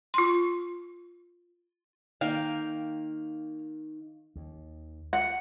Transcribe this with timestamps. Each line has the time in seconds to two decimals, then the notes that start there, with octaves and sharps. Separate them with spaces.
0.14 F4 C6
2.21 D#3 A#3 F5 G5
4.36 D#2
5.13 F#5